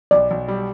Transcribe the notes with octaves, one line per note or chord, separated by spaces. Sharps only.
B1 D5
B1
G3